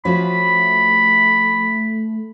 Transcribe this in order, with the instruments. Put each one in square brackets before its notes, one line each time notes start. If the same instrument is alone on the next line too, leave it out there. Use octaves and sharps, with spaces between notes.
[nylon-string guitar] F3 C#4 F#4 [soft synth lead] A3 [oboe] B5